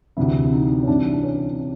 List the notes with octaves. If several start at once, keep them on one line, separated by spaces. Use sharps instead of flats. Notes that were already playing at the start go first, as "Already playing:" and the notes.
D2 C3 E3 E4
D#4
C#4
C2 C3 E3 D4
D4
C#4